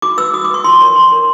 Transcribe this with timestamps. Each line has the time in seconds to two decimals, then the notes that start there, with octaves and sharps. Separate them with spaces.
0.02 F#4 D6
0.18 B4 E6
0.34 F#4 D#6
0.44 D6
0.50 B4 C#6
0.64 F4 C6
0.80 A#4 C#5 C#6
0.96 F4 C6
1.12 A#4 C#5